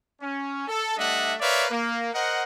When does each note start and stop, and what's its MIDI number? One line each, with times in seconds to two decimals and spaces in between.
0.21 0.66 61
0.68 0.94 69
0.97 1.34 55
0.97 1.34 57
0.97 1.34 62
0.97 1.34 75
0.97 1.34 76
0.97 1.34 78
1.40 1.66 70
1.40 1.66 71
1.40 1.66 73
1.40 1.66 74
1.40 1.66 76
1.40 1.66 77
1.70 2.11 58
2.13 2.43 70
2.13 2.43 72
2.13 2.43 75
2.13 2.43 78